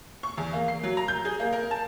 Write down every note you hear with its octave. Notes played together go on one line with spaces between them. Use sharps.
C#6
E2
A#3
C7
F#3
A#5
G6
G#4
A#3
A#4
A5